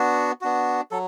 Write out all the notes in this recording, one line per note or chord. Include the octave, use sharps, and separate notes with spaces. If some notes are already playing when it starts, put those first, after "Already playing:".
Already playing: B3 D4 F#4
B3 D4 F#4
F#3 A4